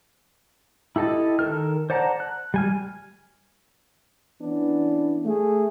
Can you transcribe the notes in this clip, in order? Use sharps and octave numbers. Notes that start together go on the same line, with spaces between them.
E4 G4 A4 D#5 A5
D#3 A4 A#4 F6
C5 D5 F#5 A5 A#5
F#6
G3 G#5 F6
E3 B3 C#4 D4
A3 G#4